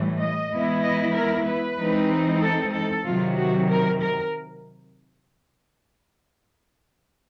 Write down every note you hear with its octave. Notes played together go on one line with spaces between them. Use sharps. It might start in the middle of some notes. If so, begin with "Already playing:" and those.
Already playing: A2 E3 G3
D#5
E3 G#3 B3 E4
D#5
A#4
B4
E3 G#3 C4 D#4
A4
A4
C3 D#3 F#3 F4
F#4
A#4
A#4